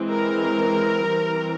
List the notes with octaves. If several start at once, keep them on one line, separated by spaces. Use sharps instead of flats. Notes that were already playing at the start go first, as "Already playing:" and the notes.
Already playing: E3 G#3 C4
A#4
E3 G3 C4